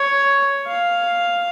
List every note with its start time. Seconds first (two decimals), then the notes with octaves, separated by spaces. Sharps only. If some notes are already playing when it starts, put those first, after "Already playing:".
Already playing: C#5
0.67 F5